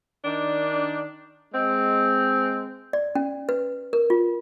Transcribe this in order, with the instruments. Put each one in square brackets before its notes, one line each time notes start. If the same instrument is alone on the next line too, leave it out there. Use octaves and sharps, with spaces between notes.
[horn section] D#3 D4
G#3 C4
[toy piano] D5
C#4
B4
A#4
F4